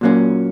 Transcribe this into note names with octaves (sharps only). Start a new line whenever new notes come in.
A#2 F#3 A#3 C#4